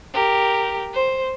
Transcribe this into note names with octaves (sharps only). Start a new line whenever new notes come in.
G4 A#4
C5